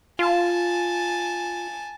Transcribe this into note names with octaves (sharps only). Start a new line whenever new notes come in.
F4 G#5 A5